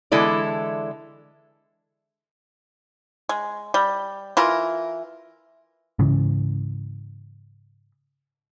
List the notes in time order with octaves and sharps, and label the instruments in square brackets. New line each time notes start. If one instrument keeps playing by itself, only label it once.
[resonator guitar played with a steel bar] D3 E3 G#3 E4 A4 D5
[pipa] G#3
G3
E3 F4 A#4
[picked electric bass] G#2 C#3 E3